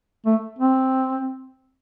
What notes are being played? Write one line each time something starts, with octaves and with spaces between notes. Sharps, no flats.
A3
C4